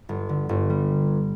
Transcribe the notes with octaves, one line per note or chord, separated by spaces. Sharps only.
G1
D3
G1
G3